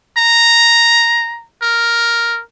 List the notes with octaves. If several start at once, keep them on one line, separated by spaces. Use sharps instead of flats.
A#5
A#4